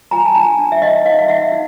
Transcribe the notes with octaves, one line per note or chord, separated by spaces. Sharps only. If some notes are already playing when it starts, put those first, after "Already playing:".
F4 G#5 A#5
A5
D4 G#5 A#5
D4
E5
D#4 D#5 F5
D#4 D#5 F5
F5
D#4 E5 F#5
D#4